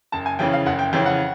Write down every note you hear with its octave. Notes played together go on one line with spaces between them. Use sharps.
F#1 A5
G#5
F2 C#3 E3 G5
F5
F#1 F#5
G5
F2 C#3 E3 G5
F#5